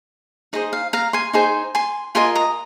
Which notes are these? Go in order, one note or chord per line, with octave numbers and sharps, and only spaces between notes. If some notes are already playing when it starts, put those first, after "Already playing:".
D#4 G#4 C5 D#5
F5
F5 A#5
G#5 C6
D#4 G#4 C5 G#5 C6
G#5 C6
F4 A#4 D#5 G#5 C6
A#5 D#6